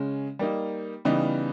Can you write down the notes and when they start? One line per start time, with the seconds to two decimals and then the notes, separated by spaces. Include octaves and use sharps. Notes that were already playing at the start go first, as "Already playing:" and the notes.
Already playing: C#3 G#3 C#4
0.39 G3 A#3 D#4
1.05 C#3 E3 G3 B3 D#4